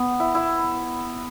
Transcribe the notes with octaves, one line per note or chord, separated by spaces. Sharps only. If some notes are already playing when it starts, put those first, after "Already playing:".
Already playing: B3
E4
E4